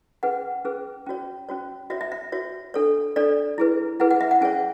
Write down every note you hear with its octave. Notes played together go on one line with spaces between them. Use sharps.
C#4 G#4 B4 F#5
C#4 G#4 B4
C#4 F#4 C#5
C#4 F#4 C#5
F#4 C#5 E5
E5
E5
F#4 C#5
D4 A4 C#5
D4 A4 C#5 D5
E4 G#4 B4
E4 G#4 B4 F#5
F#5
E5
F#5
C#4 G#4 C#5 G#5